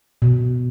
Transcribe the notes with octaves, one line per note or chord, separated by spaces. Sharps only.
B2